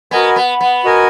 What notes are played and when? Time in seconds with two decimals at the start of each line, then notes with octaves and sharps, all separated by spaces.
0.11 B3 F#4 A#4 D#5 G#5
0.36 B3
0.61 B3
0.84 F#4 A#4 D#5 G#5